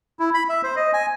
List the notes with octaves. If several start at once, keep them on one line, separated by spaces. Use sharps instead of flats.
E4
B5
E5
C5
D#5
G#5